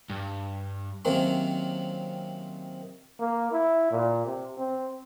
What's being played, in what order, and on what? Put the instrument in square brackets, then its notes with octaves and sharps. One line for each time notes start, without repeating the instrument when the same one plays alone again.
[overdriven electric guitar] G2
[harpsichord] C3 D#3 F#3 A#3 C4 C#4
[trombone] A#3
E4
A#2
C3
C4